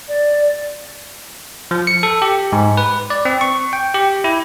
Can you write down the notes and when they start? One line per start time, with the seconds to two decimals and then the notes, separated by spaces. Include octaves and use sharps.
0.08 D5
1.71 F3
1.87 C#7
2.03 A4
2.22 G4
2.52 G#2
2.77 B4
3.10 D5
3.25 C4
3.41 C#6
3.73 G5
3.94 G4
4.24 E4